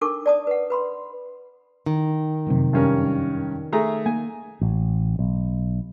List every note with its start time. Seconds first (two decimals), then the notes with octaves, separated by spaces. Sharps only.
0.01 D4 D#4 A4 A#4 C#6 D6
0.26 D5 A5 D#6
0.47 B4 F#5
0.70 B4 B5 C6
1.86 D#3
2.47 F1 F#2 C3
2.73 G2 C#4 A#4
3.73 A3 G#4 A#5
4.06 A#3 G#5
4.61 A1
5.19 B1